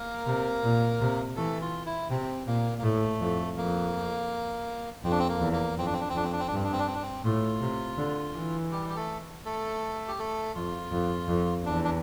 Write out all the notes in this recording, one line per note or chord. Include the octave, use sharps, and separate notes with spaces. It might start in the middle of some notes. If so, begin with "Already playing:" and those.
Already playing: A#3 A#4
C3
A#2
C3
E3 A3 A4
F4
E4
C3 C4
A#2 A#3
A#3
A2 A3
F2
F2 A#3
F2 C4
D4
C4
A#3
E2
A#3
F2 C4
D4
C4
D4
C4
F2 D4
C4
D4
C4
D4
G2 C4
D4
C4
D4
C4
D4
C4
A2 F4
C3
D3
E3
G3 G4
G4
A3 A4
A3 A4
G4
A3 A4
F2 F4
F2
F2
E2 D4
D4